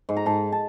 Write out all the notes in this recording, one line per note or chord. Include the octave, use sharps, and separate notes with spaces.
G#2
A#5
G#2 A5
A5